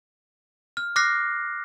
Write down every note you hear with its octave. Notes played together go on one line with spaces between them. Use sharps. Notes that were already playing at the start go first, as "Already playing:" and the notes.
F6
D6 F6 F#6 A#6 C7